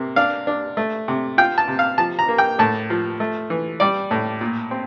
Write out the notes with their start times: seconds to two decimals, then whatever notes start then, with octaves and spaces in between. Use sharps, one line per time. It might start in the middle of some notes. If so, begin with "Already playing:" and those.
Already playing: C3 A#3
0.16 D4 F5
0.47 D4
0.77 A3
1.08 C3
1.38 F4 G5
1.58 A5
1.68 C3
1.79 F5
1.98 F3 A5
2.19 A#5
2.29 A#3
2.38 G5
2.59 A2 A5
2.90 F3
3.20 A3
3.50 E3
3.80 G3 D5
4.11 A2
4.41 A#2
4.71 C4